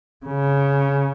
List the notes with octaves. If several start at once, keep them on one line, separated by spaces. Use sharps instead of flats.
C#3